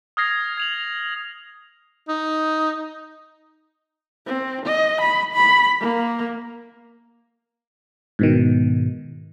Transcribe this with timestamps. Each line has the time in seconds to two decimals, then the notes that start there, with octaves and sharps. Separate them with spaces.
0.17 D#6 F6 G#6 A#6 C7
0.57 G#6 F7 F#7
2.08 D#4
4.27 C4
4.66 D#5
5.01 B5
5.34 B5
5.80 A#3
8.19 G#2 B2 D#3